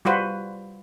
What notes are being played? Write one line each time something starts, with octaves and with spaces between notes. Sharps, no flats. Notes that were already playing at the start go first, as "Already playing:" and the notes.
G3 F4 F#4 B4 C5